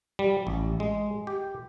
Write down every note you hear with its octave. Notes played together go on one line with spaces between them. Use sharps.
G3
A1
G#3
G4